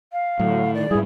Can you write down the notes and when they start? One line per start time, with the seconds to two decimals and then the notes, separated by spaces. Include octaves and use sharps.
0.12 F5
0.39 A2 D3 F#3
0.74 D#3 D5
0.91 G#2 G3 E4 G#4